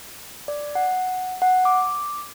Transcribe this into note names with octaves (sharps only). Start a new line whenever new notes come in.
D5
F#5
F#5
D6